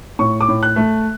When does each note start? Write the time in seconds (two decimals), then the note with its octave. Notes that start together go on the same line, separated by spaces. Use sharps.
0.19 A2 C#6
0.41 D6
0.48 A2
0.63 F#6
0.76 A3